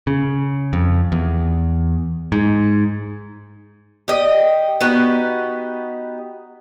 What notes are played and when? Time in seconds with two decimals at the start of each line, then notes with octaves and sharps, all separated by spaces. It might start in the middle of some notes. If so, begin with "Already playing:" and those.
0.07 C#3
0.73 F2
1.12 E2
2.32 G#2
4.08 G4 D#5
4.81 B3 D#4 F#4 G4